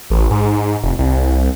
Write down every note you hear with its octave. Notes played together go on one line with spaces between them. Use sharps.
A1
G#2
F1
C2